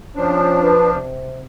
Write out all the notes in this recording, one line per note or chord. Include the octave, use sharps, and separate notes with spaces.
F3 C#4 D4
B4
C3